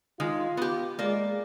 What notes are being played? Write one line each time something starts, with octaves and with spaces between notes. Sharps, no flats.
D#3 G#3 F4
B3 G4
G#3 A#3 D5